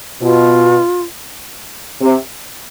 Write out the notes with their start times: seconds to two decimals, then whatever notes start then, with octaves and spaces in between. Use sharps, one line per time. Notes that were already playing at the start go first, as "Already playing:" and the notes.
0.21 B2 F4
2.01 C3